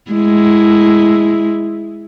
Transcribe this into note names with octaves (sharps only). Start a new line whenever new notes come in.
G#3 E4